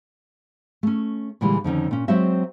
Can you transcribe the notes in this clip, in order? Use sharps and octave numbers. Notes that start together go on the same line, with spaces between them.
A3 C#4
A#2 D3 E3 G3 G#3
F2 D3 D#3 C#4
A#2 C#4
F#3 G#3 C4 F#4 C5 E5